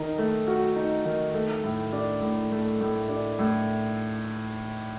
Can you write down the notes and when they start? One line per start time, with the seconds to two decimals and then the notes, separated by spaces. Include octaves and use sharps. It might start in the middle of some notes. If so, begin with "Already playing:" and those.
Already playing: D#3 D#4
0.18 A3
0.48 F#4
0.76 D#4
1.05 D#3
1.34 A3
1.64 A2
1.93 D4
2.22 A2
2.51 A3
2.81 A2
3.09 D4
3.39 A2